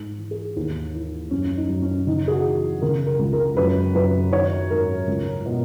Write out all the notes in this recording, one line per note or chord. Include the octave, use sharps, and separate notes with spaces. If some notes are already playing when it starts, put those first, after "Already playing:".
Already playing: G#2
E3
G#4
D#2
E3 E4
F#2 C#4
D#4
F#2
C#4
C#3 D#4
G#4
F#4
E3
C#3 A#4
A#4
C#2
A#4
F#2 B4
F#2 B4
D#3 C#5
G#2 A#4
C#2
B2